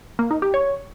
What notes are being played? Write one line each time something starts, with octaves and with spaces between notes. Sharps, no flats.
A#3
D#4
G4
C#5